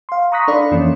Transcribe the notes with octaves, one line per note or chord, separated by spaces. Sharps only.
F5 C6
A#5 C#6 D#6 F#6 A#6 B6
D4 A4 D5 F5 B5 C6
F2 E3 A#3 C#4